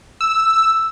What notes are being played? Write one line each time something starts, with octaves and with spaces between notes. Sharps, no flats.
E6